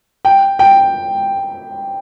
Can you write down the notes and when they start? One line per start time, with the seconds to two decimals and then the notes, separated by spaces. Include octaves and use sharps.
0.25 G5
0.59 G5